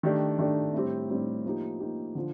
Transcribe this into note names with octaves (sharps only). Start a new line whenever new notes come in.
D#3 A3 D4 G4
D#3 A3 D4 G4
A2 G3 C4 G4
A2 G3 C4 G4
F3 A#3 D#4 G4
F3 A#3 D#4 G4
D3 F3